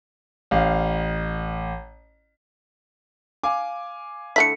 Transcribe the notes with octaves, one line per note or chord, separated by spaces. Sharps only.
A1 F5
F5 G#5 D6
D3 A3 E4 B6 C#7